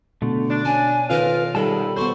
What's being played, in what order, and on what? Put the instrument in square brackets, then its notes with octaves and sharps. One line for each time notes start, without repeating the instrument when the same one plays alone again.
[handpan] B2 [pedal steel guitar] D3 A3
[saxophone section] D4
[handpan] C#4 [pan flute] G#5 [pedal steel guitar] A5
[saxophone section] F2 A#4 F5 [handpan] D#3 C#4 F4 [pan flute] B4
[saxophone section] G#2 C3 D#3 [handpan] G3 [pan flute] A4 [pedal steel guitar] A5 B5
[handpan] B3 F#4 A4 [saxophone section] C5 [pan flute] C#6